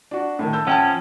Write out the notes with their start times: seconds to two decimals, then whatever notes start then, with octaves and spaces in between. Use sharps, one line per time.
0.11 D4 F#4
0.39 A2 D#3
0.53 A5 E6 G6
0.67 F3 C#4 F#5 G5 A5